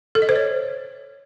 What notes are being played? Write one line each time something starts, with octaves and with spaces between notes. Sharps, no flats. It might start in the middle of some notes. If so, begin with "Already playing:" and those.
A4
D#5
C5
C#5